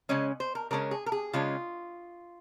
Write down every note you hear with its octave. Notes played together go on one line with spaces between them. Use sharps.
C#3 G#3 C#4 D#5
C5
A#4
C#3 G#3 C#4 A#4
G#4
A#4
G#4
C#3 G#3 C#4 F4